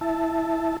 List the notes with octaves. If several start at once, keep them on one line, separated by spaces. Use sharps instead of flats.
E4 E5 A5